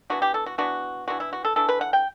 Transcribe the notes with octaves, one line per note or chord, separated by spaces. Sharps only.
E3 B3 D4 F#4
G4
A4
F#4
E3 B3 D4 F#4
E3 B3 D4 F#4
E4
F#4
A4
E3 A3 D4 A4
B4
F#5
G5